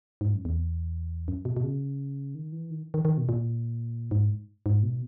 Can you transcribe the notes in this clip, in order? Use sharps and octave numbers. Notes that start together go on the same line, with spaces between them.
G#2
F#2
E2
F#2
B2
B2
C#3
D#3
E3
D#3
D#3
D#3
B2
A#2
G#2
G#2
B2